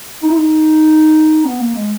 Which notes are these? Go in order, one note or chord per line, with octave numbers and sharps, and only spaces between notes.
D#4
E4
D#4
B3
A#3
G#3